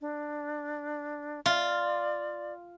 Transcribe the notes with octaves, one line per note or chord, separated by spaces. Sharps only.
D4
F4 D5